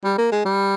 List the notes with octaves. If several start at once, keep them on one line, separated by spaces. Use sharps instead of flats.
G3
A#3
G#3
G3